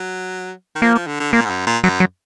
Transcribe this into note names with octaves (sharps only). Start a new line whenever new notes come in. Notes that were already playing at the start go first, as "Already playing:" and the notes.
Already playing: F#3
D#3
F3 A#3
F3
D3
D3
A#2 A#3
G#2
F#2
A#2
F#2 F#3
F#3